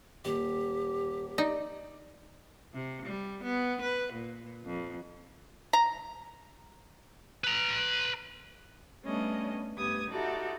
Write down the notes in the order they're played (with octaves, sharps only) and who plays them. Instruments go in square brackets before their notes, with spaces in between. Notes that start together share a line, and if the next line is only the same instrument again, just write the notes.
[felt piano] D#1 [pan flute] G4
[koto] D#4 [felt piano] D5
[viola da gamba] C3
G3
B3
B4
A#2
F2
[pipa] A#5
[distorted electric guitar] B4 A#5
[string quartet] G3 A3 B3 C#4 D4 D#5
D2 G2 B3 G4 D#6 G#6
D#4 E4 F#4 G4 A4 D5